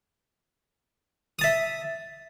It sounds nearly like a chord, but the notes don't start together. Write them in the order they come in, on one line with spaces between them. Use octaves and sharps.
D#6 A5 E5